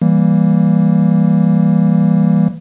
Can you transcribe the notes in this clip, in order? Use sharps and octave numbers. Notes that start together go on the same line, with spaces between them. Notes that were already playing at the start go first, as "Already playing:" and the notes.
E3 G3 A#3